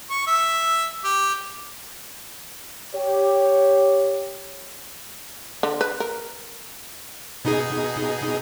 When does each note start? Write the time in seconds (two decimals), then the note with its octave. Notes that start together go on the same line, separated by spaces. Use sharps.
0.10 C#6
0.27 E5
1.04 G4
2.95 G4 C#5
5.63 D3
5.81 B4
6.00 A#4
7.45 B2 D#4 G#4